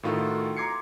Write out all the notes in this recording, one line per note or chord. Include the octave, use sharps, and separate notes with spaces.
A2 D#3 F4 F#4 A4
A#5 C6 D6 G#6 C7 C#7